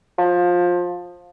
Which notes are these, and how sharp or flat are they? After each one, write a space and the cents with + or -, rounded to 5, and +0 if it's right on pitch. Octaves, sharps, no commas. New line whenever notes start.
F3 +20